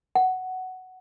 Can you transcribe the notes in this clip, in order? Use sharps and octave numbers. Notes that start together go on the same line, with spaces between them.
F#5